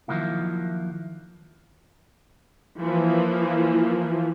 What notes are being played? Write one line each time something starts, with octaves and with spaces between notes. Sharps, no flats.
D#3 F3 F#3 A#3 E4
E3 F3 A#3